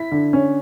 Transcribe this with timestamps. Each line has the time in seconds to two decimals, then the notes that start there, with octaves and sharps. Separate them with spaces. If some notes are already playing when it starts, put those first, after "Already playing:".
Already playing: E4 B6
0.12 D3
0.33 C#4